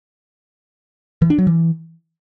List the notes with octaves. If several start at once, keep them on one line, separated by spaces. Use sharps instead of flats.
E3
D4
F#3
E3